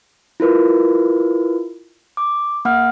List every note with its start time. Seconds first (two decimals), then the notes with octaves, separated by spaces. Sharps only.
0.40 E4 F4 A#4 B4
2.17 D6
2.65 A#3 F#5 F6